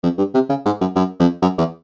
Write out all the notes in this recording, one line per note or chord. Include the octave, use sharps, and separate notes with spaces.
F2
G2
C3
C#3
G#2
F#2
F#2
F2
F#2
E2